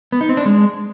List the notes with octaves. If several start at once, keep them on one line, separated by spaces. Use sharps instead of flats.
B3
D#4
C4
D4
G#3